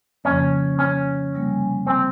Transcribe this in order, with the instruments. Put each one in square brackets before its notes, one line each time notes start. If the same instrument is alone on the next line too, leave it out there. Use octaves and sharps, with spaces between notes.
[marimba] F2 C#3 F3 A#3 [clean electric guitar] C#4
[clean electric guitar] C#4
[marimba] C3 G3 A#3
[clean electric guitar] C4